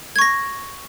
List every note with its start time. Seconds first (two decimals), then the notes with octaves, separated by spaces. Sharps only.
0.16 G#6
0.19 C#6
0.22 A#6